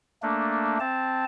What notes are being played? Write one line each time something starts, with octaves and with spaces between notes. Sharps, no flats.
A3 A#3 D4
C4 A5